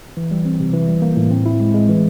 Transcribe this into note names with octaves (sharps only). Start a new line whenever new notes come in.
E3
G3
C4
C3
E3
G3
A#3
A2
C4
E4
G#3
G#3
E3